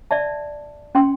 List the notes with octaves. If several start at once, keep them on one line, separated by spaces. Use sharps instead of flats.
D5 E5 A5
C#4 G5 C6